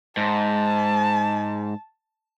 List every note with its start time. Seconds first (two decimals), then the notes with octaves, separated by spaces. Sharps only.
0.17 G#2 A5